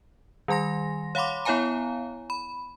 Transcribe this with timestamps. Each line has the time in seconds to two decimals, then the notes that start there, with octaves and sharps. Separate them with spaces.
0.48 D#3 G3 G#5 C6 A#6
1.15 C#5 F5 F#5 B5 C6 D6
1.45 B3 E4 C#5 F5 G#5 A#5
2.30 B5